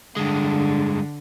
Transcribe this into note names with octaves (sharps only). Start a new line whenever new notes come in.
G2 D3 G#3